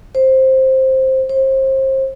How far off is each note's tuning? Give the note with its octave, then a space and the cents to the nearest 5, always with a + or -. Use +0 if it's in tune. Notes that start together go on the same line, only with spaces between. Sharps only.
C5 +10
C5 +30